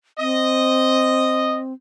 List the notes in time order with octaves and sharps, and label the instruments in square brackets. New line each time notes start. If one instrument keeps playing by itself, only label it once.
[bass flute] C4 [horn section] D#5